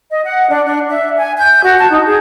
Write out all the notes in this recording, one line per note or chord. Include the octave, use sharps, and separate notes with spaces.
D#5
F#5
D4
D4
E5
G#5
G6
F#4
A5
D#4
G#4